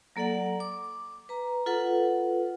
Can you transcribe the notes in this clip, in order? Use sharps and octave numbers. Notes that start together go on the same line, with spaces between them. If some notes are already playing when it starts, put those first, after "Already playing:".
F#3 A#3 A4 D5 F#5
D6
B4 A#5
F4 A4 B4 F#5